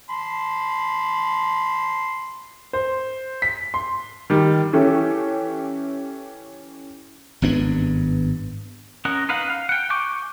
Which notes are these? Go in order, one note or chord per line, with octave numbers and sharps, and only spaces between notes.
A5 B5 C6
C5
B6
C6
D#3 G3
E3 C#4 G4 A4
G#1 G2 B3 D4
C#4 A#4 D#5 F#5
D#4 B4 F5 F#5
F5
F#5 G5
G#5 C#6 D6 G6